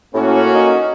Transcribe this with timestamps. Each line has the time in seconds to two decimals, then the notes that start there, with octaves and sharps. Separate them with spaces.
0.14 A2 A#3 C#4 F#4
0.55 D#4